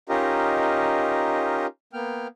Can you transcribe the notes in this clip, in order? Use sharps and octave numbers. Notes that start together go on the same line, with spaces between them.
C#4 D#4 F4 G4 A#4 D#5
A#3 B3 G5 F6